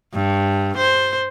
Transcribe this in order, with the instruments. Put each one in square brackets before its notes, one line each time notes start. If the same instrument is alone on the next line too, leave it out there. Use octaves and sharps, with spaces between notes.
[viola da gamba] G2
C5